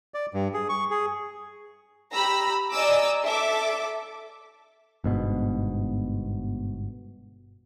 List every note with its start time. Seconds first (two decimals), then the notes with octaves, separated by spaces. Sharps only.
0.14 D5
0.34 G2
0.54 G#4
0.69 C#6
0.90 G#4
2.14 G4 A#5 B5 E6
2.73 D5 D#5 G#5 A#5 D6 E6
3.23 A4 E5 D6
5.04 G1 G#2 B2